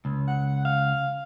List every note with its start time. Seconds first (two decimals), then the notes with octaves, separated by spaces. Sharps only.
0.05 C#2
0.27 F#5
0.65 F5